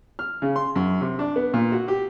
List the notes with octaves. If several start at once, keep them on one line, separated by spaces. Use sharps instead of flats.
F6
C#3
C6
F#2
C3
D4
B3
A#2
F#4
G4